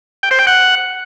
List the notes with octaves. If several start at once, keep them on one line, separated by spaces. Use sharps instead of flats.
G5
C5
G5
F#5